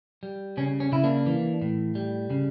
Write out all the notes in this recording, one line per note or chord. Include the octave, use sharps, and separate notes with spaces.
G3
C#3 C#4
C#4
C#3 E4
A#3 D4
E3
A2
G3
C#3